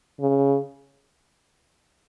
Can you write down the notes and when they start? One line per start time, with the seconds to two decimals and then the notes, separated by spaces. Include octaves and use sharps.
0.20 C#3